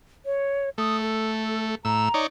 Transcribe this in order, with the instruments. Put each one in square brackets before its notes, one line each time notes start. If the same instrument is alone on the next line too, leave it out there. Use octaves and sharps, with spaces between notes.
[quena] C#5
[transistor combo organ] A3 [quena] D#6
[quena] A4
[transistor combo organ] A2 E6 [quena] A#5
[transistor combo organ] D#4 C#5 D5